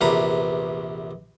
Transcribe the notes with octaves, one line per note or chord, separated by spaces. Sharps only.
A#1 E2 C3 B4 A#5